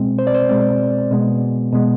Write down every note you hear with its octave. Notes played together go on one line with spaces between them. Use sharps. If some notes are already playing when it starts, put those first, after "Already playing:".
Already playing: B2 G#3 C4
C5
D5
C5
B2 G#3 C4 D5
B2 G#3 B3
B2 G#3 B3